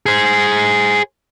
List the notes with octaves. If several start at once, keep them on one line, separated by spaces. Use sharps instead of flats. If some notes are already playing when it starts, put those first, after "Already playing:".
G#4 C5